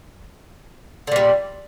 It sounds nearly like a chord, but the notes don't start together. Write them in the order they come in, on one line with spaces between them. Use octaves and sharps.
D3 A#2 G3